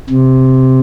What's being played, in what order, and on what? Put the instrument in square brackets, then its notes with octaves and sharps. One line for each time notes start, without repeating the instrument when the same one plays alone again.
[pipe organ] C3